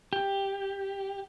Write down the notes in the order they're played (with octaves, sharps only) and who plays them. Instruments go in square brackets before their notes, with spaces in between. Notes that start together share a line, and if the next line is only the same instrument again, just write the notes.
[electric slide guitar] G4